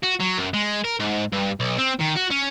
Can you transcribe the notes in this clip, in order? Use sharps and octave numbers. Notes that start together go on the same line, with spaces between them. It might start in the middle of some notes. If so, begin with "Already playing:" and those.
F#4
F#3
F#2
G#3
A#4
G#2
G2
B1
C4
D#3
F#4
C#4